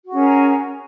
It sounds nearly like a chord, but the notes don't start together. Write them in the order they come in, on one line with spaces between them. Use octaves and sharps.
F#4 G#4 C#4 A#4